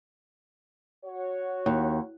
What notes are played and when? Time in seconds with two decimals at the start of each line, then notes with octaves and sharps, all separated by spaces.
1.05 F#4 C#5
1.66 D#2